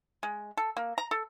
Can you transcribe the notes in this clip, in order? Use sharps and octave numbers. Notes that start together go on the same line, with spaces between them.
G#3
A4
A#3
A#5
A4